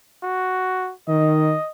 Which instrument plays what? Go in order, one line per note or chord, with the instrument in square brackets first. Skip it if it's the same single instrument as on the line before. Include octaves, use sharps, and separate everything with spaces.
[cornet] F#4
[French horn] D#3 [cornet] D#5